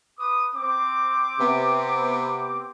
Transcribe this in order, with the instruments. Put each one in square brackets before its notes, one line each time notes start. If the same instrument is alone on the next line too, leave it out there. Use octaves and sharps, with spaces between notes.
[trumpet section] B4 D6 D#6
C4 D6
[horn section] C3 B3